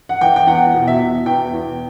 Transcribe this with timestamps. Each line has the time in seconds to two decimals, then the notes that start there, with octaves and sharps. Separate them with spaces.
0.09 F#5
0.21 E3 G5
0.36 G5
0.47 E2 F#5
0.74 B2
0.87 E5
1.00 B2
1.26 E2 G5
1.53 E2